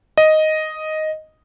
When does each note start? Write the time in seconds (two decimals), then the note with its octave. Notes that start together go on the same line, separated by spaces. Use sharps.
0.18 D#5